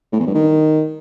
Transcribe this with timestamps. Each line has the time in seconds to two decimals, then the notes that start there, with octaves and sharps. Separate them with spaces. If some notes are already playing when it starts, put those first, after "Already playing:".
0.12 A2
0.19 E2
0.27 G2
0.34 D#3